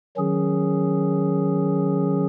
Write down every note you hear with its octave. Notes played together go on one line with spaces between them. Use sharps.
D#3 F#3 C#4 G#4